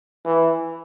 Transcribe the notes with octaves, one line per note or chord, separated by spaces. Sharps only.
E3